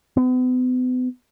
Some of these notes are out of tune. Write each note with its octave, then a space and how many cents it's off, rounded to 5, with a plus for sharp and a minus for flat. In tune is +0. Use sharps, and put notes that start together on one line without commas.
B3 +40